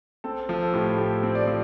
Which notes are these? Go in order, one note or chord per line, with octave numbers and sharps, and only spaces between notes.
C4 A4
F3 A4
A4
A2 G4
A2 G4
A4
C4
D5
F3